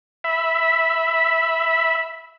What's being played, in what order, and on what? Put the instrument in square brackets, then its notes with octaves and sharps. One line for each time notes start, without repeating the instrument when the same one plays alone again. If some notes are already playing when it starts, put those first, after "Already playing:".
[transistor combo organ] E5 B5